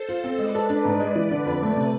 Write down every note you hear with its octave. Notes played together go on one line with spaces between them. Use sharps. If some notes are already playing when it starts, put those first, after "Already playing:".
Already playing: A4 C5
F4
C4
G#3 B4 D5
A4
D4
G#2
G#3
E3
D3
F2
A3
C3